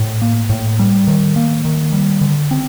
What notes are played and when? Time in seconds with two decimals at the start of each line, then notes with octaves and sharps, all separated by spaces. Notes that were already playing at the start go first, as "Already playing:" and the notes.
Already playing: A2
0.22 A#3
0.49 A2
0.79 G3
1.08 D#3
1.36 A#3
1.65 D#3
1.93 G3
2.21 D3
2.51 C4